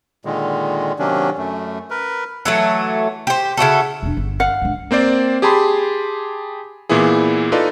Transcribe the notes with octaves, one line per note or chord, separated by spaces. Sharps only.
A#2 D3 D#3 G#3
C3 D#3 F#3 A#3 C#4 D4
F#2 A3
A#4 B4
E3 F#3 A3
G4 C5
C#3 E4 F#4 A4
E1 D4
G1
F5 F#5
G#2 D3
A#3 C4 C5 D5
G4 G#4 G#5 A5 B5 C6
A#2 E3 B3 E4 G#4
D#4 F4 A4 B4 D5 D#5